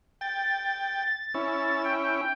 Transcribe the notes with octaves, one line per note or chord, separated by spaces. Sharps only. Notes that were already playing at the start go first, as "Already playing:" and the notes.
G5 A6
C#4 E4
G5